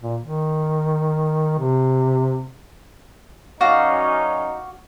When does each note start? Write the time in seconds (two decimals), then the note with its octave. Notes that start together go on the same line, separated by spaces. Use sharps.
0.03 A#2
0.21 D#3
1.59 C3
3.61 F#2 C#4 D#4 F#4 D5 F5